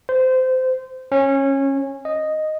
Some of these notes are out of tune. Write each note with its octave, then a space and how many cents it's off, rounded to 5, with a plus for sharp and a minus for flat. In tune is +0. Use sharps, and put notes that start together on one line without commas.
C5 -20
C#4 -20
D#5 -5